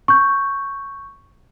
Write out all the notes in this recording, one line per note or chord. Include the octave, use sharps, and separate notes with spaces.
C#6 G6